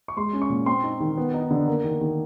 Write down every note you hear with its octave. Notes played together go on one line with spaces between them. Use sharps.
C#6
G#3 C6
C#4
C#6
A#2
C4 C6
D#4
D#3
B3
D#4
D3
A#3
D#3
D#3